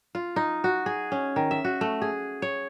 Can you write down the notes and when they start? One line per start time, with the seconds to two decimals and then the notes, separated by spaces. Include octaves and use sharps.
0.15 F4
0.36 D#4
0.64 F#4
0.86 G#4
1.12 C#4
1.36 D#3
1.51 E5
1.65 F#4
1.81 A3
2.02 G#4
2.42 C#5